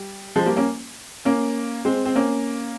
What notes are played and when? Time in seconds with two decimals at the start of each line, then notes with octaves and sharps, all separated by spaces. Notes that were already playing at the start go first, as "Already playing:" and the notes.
Already playing: G3
0.36 F3 G#3
0.46 G3 A#3
0.56 A#3 C#4
1.25 A#3 C#4
1.85 G#3 C4
2.06 C4
2.16 A#3 C#4